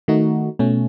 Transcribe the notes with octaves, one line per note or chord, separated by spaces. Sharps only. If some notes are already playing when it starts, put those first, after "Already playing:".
D#3 A3 D#4 F#4
B2 A3 C#4